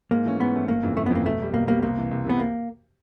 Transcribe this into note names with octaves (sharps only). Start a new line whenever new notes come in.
G#2 A#3
E3 A3 C#4
G#2 B3
E3 A3 C#4
G1 A#3
F2 C#3 E3
G1 A3
B3
F2 C#3 E3 A#3
B1 A3
B2 G3
B1 A#3
B2 G3 A#3
C2 A#3
C3 E3
C2
C3 E3 B3
A#3